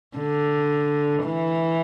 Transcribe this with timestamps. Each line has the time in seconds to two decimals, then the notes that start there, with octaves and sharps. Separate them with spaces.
0.17 D3
1.24 E3